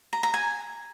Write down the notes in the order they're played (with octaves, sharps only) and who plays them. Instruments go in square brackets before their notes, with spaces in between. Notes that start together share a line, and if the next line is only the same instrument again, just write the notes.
[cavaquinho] A#5
A#5
G#5